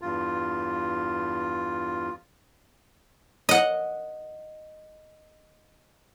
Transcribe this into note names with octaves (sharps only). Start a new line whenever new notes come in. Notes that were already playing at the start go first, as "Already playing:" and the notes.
E2 G2 F4
D#5 F#5